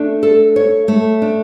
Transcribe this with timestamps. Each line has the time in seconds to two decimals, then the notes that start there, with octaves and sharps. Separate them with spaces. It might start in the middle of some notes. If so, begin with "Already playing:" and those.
Already playing: A3 D4
0.23 A4
0.56 C#5
0.88 A3
1.22 D4